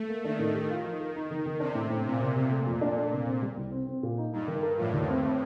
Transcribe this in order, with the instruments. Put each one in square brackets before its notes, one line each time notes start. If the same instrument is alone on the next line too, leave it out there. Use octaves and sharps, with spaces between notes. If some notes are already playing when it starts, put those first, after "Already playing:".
Already playing: [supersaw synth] A3
[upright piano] A#3
[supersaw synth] D#3 [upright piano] D4
[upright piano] A2
G4
F4
F3
A#4
D#4
D#3
D#3
[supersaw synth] C3 [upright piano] D4
[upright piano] A2
A2
[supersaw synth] A#2 [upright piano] C4
[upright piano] C3
C3
A3
F2
D4
A3
C3
C4
G3
C2
C4
C4
A#2
D#4
[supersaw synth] G2 [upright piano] D#4
[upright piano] D#3
A#4
[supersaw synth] A2 [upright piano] F3
[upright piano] D#2
C4
C4